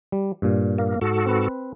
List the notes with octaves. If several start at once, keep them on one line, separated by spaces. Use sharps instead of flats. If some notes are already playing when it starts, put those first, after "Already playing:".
G3
G2 A#2
A#3
G#2 F#4 A4
C4 B4